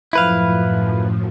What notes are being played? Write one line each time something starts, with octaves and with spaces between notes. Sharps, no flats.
F#2 A2 F3 E4 B4 F5